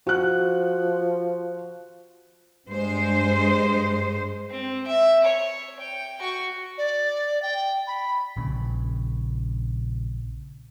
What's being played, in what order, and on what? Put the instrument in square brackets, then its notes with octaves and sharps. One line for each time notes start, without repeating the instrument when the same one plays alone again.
[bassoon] F3 [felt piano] F#4 F#6
[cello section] G2 G#3 C5
[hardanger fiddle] C4
E5
C#5
G5
F#4 C#6
[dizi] D5
G5
B5
[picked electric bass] A#1 C#3